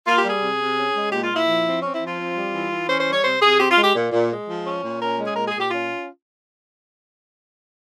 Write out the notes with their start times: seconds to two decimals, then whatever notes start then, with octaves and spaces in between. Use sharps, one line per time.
0.06 A#3 F4
0.18 G4
0.25 G3 G#4
0.41 C3
0.60 C3
0.77 C#4
0.95 G#3
1.12 A#2 G4
1.24 F4
1.30 A#2
1.36 E4
1.48 F3
1.66 C4
1.82 C4 C#4
1.95 E4
2.01 F3
2.07 F4
2.18 C4
2.36 G3
2.53 E3
2.72 E3
2.89 C#4 C5
3.00 C5
3.06 G3
3.12 C#5
3.24 C3 C5
3.42 C3 G#4
3.60 C4 G4
3.71 F4
3.77 G#3
3.83 G4
3.96 A#2
4.12 A#2
4.30 G#3
4.47 F3
4.65 C#4
4.83 A#2
5.00 C#4 A#4
5.19 G#3
5.26 G#4
5.36 A#2 A#4
5.48 G#4
5.54 A#2
5.60 G4
5.71 C#4 F4